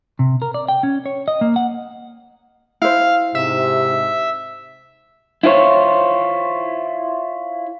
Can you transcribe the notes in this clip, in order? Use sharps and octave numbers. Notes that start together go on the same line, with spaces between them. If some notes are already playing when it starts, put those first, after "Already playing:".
C3
A#4
D5
G5
C#4
C#5
D#5
A#3
F#5
E4 C5 F5
G#2 C3 E5
E4 F4 C5 C#5